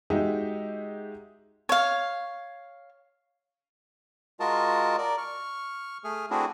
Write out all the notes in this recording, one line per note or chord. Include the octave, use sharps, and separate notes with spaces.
G#3 D#4 F#4 G4 E5
C#5 F5
G#3 F4 F#4 A#4 D#5 A5
A#4 D5
C#6 F6
A3 G#4 F6
A3 C4 D4 E4 F#4 G#4